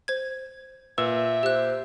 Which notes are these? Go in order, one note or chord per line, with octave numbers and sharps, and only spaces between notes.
C5 G#6
A#2 B4 E5 E6
G4 C5 F#6